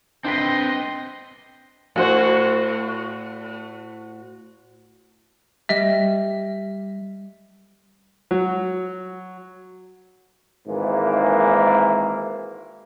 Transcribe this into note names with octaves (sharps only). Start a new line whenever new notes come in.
C4 D4 B4 D#5 G5 C6 B6
A2 F#4 C5
G3 D#5 E5
F#3
G#1 G#2 E3 A#3